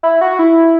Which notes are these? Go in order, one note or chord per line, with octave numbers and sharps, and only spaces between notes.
E4
F#4
E4